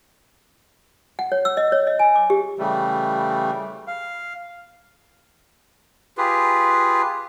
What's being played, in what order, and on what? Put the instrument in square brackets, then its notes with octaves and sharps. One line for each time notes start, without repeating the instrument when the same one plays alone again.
[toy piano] F#5
C#5
E6
D#5
C#5
D#5
G#5
D6
G4
[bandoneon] C#3 E3 G3 A3
F5
[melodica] F4 G4 G#4 B4